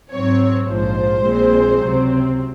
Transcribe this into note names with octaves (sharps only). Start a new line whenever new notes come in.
G#2 F#3 C4 C#5
A#1 G#2 F3 C5
A#1 A#2 G#3 C4
C#2 C3 F#3 C4